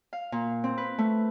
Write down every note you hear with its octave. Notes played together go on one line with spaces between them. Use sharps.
F5
A#2
C4
B4
A3